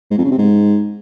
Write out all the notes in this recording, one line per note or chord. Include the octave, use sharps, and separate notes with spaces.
G#2
F2
C#3
C3
G#2